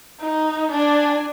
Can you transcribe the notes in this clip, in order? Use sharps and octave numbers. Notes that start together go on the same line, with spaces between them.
D#4
D4 G#5